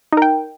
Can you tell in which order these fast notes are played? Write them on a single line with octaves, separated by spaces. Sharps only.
D#4 A#4 G5